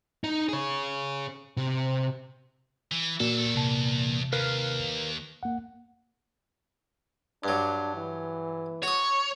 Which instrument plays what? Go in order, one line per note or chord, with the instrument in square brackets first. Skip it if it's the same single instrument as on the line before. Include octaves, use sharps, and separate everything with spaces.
[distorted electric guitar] D#4
G#4 C#5
C3
E3
[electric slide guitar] A#2 [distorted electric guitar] E3 A4 [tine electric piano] F#4
[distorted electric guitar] D#3 A4
[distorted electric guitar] E2 [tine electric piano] C3 A5
[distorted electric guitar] D#2 [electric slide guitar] A#4 B4 F5
[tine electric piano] A#3 F#5
[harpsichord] G2 F#3 [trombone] D4
[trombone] E3
[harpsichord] F#4 D#6 [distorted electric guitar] C#5